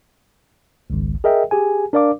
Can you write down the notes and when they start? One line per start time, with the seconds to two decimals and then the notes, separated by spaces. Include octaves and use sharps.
0.90 G#1 C#2
1.24 G#4 A#4 D#5 E5 G5
1.51 G4 G#4 G#5
1.93 D4 A#4 D5 F5 D6